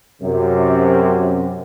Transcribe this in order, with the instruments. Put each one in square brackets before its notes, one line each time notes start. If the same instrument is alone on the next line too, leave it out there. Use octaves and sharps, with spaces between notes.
[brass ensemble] F#2 C3